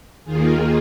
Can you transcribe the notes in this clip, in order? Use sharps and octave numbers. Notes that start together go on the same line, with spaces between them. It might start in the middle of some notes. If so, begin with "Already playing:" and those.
D#2 D#3 A#3 F4 G#4